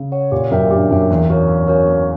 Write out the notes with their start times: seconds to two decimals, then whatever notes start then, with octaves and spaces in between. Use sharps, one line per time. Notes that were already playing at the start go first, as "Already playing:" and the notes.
Already playing: C#3
0.12 C#5 F#5
0.32 A#2 G4
0.51 F#2 A#4 E5 G5
0.62 A#2
0.71 G2 G4
0.90 F#2 A#4 E5 G5
1.10 E2 A#3
1.28 C#4 F#4 A#4 C#5
1.48 A#3
1.68 C#4 F#4 A#4 C#5
1.87 A#3